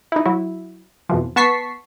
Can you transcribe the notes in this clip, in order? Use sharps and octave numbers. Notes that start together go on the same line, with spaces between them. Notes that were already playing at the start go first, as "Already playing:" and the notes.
D#4 E4
F#3 E4
F2 B2 E3 F3
B3 A5 C#6 B6 C7